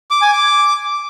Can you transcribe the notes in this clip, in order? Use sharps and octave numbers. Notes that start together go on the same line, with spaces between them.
D6
G#5
D6